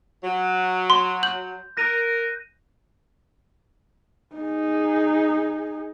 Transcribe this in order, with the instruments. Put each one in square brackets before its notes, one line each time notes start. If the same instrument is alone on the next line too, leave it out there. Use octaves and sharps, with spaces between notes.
[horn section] F#3
[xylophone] C6
[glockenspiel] G6 [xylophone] F#7
[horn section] A#4 [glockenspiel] F#6 A#6 D#7
[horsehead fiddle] D#4 G#4